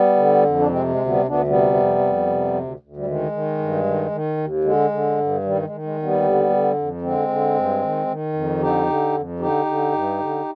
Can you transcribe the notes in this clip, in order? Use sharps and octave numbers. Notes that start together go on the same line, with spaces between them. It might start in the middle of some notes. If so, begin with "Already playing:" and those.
Already playing: G3 B3
D3
F2
D4
C3 G#3 C4
G#3
D2
G3 B3
D2
B3 D4
C3 G3 B3
F2
F2
C3
D2
D2
G3
D#3 G#3
D#3
G2
D#3
D#3
D#2
D3 G#3
D3
G2
D#3 G3
G#3
D#3
G#3
D#2
G3 B3
D3
D3
F2
D3 G#3 C4
D3
G2
D#3
D#3
F2
D3 D#4 G4
D3
F2
D3 D#4 G4
D3
G2
D3